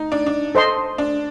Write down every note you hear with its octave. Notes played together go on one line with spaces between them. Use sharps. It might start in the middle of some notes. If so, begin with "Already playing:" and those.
Already playing: D#4
D4
D4
A4 C5 D#5 A5 C6
D4